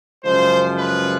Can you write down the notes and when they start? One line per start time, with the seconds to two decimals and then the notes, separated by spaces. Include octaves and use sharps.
0.24 F#2 C#3 F3 G#3 C5
0.77 B4